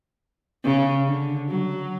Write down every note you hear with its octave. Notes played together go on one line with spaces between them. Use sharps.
C#3
D3
F#3